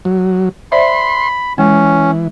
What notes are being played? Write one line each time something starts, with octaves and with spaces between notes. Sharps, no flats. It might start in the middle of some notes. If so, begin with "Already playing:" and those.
F#3
C5 D5 E5 B5 C6
E3 G#3 C#4